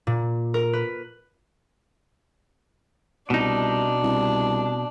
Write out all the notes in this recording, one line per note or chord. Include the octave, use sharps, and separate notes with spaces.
A#2
A#4
B4
C2 B2 D4 D#4
C2